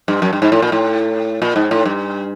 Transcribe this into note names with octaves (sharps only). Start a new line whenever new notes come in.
G2
F#2
G2
G#2
A2
A#2
A2
A#2
G#2
A2
G2